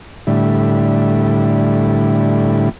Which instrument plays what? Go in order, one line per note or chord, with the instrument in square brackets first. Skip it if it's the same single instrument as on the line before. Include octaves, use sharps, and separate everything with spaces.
[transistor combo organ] A2 D3 G3 E4